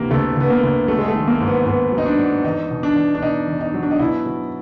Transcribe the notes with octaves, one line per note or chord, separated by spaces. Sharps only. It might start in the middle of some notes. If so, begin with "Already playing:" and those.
Already playing: D2 C3 E3 A#3 B3
D2 A3
D2 B3
A#3
D2
F#3 A3
G#3
A3
D#3
A#3
G#2
B3
G#2 B3
F#3
D#4
D4
F#3
E2 D#4
B2
D4
E2
D4
B2 D#4
E2
D#4
F#3
D4
D#4
B2 E4
F#3